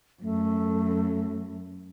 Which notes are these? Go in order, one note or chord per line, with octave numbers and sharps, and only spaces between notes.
F#2 A3